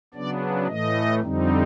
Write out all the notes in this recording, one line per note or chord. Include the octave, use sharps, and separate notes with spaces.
C#3 F#3 B3 D4 D5
A2 E3 A3 D#5
F2 D3 G3 C4 D#4